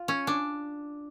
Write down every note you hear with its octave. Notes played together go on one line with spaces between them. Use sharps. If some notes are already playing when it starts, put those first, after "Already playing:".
Already playing: F4
C#4
D4